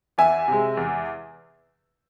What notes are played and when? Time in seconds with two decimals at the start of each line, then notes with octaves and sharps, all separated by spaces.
0.18 E2 E5 G#5
0.48 C3 G#3
0.77 E2